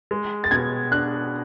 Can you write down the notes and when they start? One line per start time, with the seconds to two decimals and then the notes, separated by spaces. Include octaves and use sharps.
0.11 G#3
0.44 A6
0.51 B2 G#6
0.91 D4 F#6